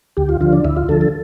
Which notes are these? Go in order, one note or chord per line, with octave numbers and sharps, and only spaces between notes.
D2 G4
F4
D3 F3 F4
D4
D2 E4
F4
D3 F3 A4
A4